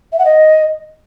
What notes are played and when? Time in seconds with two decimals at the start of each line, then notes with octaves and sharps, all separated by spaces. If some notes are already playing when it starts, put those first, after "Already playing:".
0.12 E5
0.19 F#5
0.25 D#5